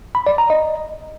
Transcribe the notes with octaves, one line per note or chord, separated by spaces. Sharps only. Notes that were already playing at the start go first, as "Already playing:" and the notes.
B5
D5
A#5
D#5